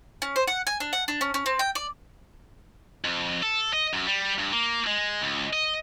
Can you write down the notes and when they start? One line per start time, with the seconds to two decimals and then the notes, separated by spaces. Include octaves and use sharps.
0.22 C#4
0.36 C5
0.47 F#5
0.67 G#5
0.80 D4
0.93 F#5
1.08 D4
1.21 C#4
1.34 C#4
1.46 C4
1.59 G5
1.75 D5
3.04 F2
3.43 A4
3.73 D#5
3.94 F#2
4.07 G3
4.39 G2
4.53 A#3
4.87 G#3
5.22 C#2
5.53 D#5